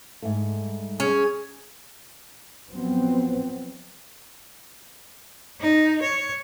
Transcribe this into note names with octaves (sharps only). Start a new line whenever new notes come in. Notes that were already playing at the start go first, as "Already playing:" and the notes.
G#2 A3
G3
C#4 G#4 G#6
F3 F#3 B3 C4
D#4
C#5